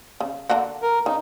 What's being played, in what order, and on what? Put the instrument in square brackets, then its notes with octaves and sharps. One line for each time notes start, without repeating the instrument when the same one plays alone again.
[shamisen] C#3
D3 A#3 F#4
[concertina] A#4
[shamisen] C#3 [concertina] D#4